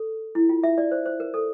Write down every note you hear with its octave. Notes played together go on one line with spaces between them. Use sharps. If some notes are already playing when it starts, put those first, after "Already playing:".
Already playing: A4
E4
F4
E5
D5
C5
C5
A#4
A4